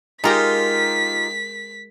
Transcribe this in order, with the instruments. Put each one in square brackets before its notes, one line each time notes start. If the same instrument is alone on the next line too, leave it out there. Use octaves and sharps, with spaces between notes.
[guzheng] G#3 A#4 A#5 [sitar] D#4 F4 G4 [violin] B6